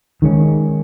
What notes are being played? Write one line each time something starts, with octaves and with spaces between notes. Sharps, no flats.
D#3 G#3 C#4